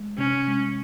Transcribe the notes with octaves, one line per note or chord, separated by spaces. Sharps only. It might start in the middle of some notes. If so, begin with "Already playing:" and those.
Already playing: G#3
C3 C#4
G#3